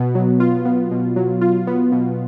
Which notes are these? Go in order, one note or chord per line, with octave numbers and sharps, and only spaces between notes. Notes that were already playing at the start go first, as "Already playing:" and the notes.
Already playing: B2 B3
F#3
F4
B3
B2
F#3
F4
B3
B2